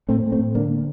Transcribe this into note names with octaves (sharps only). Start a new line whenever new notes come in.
A2 A3 C4
A2
A3 C4
A2
D3 A#3 D4